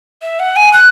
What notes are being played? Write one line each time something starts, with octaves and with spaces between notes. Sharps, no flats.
E5
F#5
G#5
F#6